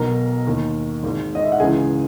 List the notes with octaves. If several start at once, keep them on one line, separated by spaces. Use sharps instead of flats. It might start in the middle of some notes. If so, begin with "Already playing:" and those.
Already playing: B1 B2 A#4 A#5
D#2 D#3
G#1 G#2 D#3
D#5
E5
F#5
C#2 C#3 E3 G#4 G#5